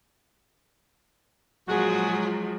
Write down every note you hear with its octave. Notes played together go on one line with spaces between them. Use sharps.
A#2 F3 F#3 G#3 F#4 G#4